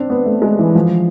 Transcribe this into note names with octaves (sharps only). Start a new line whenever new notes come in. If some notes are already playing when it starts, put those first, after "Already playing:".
Already playing: C4 D4
B3
A3
G#3
E3
F3